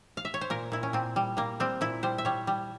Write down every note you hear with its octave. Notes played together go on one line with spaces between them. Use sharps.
F5
E5
C#5
C5
A#2 A#4
A#2 E4
C#4
A#2 C4
G3
G3 A#3
G3 C4
A#2 E4
G3 C5
E5
G3 C#5
G3